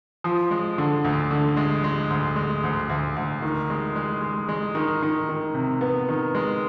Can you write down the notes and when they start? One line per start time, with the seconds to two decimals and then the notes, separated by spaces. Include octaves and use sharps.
0.24 F3
0.51 G#3
0.78 D3
1.05 D2
1.31 D3
1.57 G#3
1.84 G#3
2.10 D2
2.36 G#3
2.63 D2
2.90 D2
3.16 D2
3.42 D#3
3.70 G#3
3.96 G#3
4.22 G#3
4.49 G#3
4.75 D#3
5.03 D#3
5.29 D#3
5.55 C3
5.81 B3
6.09 D#3
6.35 G#3